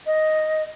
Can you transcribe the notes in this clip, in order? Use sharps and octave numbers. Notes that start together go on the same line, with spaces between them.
D#5